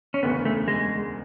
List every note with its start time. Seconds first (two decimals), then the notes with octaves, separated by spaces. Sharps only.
0.14 C#4
0.23 E1 D2 C#3 B3
0.45 A3
0.68 G#3